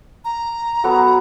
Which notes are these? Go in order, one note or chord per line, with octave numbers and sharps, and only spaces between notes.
A#5
F#3 B3 A4